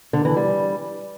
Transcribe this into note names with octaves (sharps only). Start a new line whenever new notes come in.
D3
E3
G3